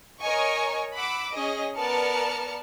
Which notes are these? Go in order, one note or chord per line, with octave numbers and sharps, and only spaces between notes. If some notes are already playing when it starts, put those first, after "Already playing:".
A#4 C#5 D#5 G#5 C#6
F#5 B5 D6 E6
C#4 G#4 D#5
B3 A#4 D5 A5 F6 C#7